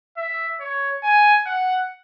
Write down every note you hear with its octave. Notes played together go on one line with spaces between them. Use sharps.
E5
C#5
G#5
F#5